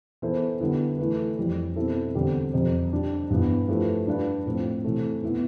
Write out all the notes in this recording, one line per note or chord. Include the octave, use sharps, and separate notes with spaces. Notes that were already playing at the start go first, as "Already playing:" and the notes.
E3 B3 E4 A4 C5
D3 G3 B3 E4
E3 A3 E4 B4
F2 E3 G3
B2 G3 C4 E4 A4
E2 D3 G3 C4 G4
F2 C3 G3
G3 D4 G4
G2 E3 B3
F3 A3 E4 G4 B4
G3 D4 F4 B4
A2 F3 C4
C3 E3 A3
B2 B3 E4